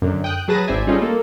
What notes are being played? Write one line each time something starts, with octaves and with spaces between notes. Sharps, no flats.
F#2 D3
G5 D#6 F#6
F#3 G#4 B4 A5 A#6 D#7
G#1 C4 C5 D5 E5 G#5
G3 C#4 D#4 F4 G#4 A4
A#3 A4